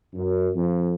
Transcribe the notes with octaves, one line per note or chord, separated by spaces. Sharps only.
F#2
F2